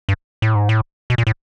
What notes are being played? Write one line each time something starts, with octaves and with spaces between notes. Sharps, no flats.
G2
A2
G#2
A2
B2
A#2
A2